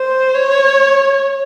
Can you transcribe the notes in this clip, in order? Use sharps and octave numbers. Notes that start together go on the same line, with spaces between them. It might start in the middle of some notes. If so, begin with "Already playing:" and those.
Already playing: C5
C#5